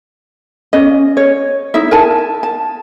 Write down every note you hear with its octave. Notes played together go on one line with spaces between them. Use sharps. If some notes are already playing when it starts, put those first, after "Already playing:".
C#4 D#5
C#5
D#4 E4 E5
A#4 G#5 A5
A5